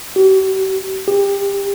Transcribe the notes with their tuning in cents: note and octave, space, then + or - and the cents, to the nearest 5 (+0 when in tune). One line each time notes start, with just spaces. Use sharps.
G4 -45
G4 +25